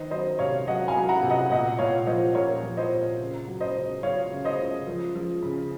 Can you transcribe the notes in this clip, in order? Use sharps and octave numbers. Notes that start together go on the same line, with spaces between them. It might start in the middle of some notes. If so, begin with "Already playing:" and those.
Already playing: D#3 C5 D#5
F#3 C5 D#5
C3 C#5 F5
F#3 D#5 F#5
F5 G#5
F#3
F#5 A#5
C3
D#5 F#5
A#2 D#5 F#5
A#2 C#5 F5
F3 C5 D#5
A#2 A#4 C#5
F3
C5 D#5
A#2
C#3
F#3
C5 D#5
C#3
F#3 C#5 F5
C#3
C5 D#5
C#3
F3
F3
C#3